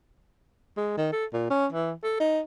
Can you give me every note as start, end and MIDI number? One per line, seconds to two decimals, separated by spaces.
0.77 0.95 56
0.97 1.10 51
1.12 1.25 69
1.33 1.47 46
1.50 1.66 61
1.72 1.92 52
2.03 2.19 69
2.20 2.41 63